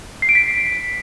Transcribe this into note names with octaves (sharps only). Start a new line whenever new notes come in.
C7
D7
B6